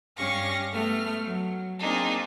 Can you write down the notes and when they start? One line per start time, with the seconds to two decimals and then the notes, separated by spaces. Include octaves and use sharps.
0.16 G2 C#4 G4 F5 C#6 A#6
0.72 A3 B3 F6
1.24 F#3
1.80 A#3 C4 D4 D#4 G#4